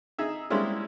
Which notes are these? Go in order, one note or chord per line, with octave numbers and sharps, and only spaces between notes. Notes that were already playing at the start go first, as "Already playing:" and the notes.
D#4 G#4 E5
G3 G#3 A#3 C4 C#4 E4